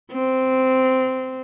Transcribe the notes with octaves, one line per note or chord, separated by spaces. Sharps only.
C4